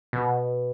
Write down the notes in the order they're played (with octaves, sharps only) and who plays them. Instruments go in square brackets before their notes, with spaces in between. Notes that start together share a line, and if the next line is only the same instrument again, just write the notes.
[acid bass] B2